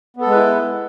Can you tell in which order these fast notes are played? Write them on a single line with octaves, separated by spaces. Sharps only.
B3 A4 G#3 B4 E4